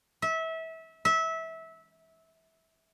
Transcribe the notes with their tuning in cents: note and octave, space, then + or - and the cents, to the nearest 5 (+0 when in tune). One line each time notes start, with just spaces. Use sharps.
E5 -25
E5 -20